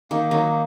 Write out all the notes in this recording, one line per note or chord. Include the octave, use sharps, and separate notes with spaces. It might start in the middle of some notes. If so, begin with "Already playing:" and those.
D#3 A#3 D#4
D#3 F#3 D#4